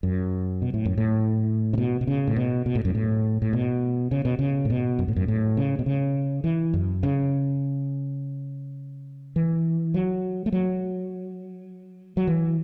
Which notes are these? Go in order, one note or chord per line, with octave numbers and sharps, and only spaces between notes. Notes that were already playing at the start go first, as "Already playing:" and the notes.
F#2
B2
A2
F#2
A2
C#3
B2
B2
C#3
A2
B2
B2
A2
F#2
A2
A2
B2
C#3
B2
C#3
A2
B2
F#2
A2
F#2
A2
C#3
B2
C#3
E3
F#2
C#3
E3
F#3
A3
F#3
F#3
E3